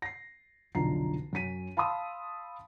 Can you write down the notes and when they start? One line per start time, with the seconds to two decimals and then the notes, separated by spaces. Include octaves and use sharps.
0.02 A#6 C7
0.75 F1 B1 D3 F4 A#5 C7
1.33 F#2 C#4 B6 D#7
1.77 F5 A5 B5 C6 D#6 E6